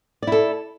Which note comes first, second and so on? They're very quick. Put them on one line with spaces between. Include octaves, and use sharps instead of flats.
D5 E4 A4